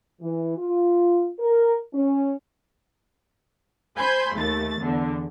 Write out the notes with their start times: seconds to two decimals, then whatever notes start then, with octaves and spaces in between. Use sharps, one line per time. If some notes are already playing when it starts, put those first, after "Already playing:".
0.21 E3
0.57 F4
1.39 A#4
1.93 C#4
3.97 C5 G#5 B5 C6 G6
4.34 D#2 A3 A6
4.81 E2 D3